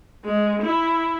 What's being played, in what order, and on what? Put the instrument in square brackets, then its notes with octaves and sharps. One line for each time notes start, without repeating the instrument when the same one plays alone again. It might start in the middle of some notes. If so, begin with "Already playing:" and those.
[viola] G#3
E4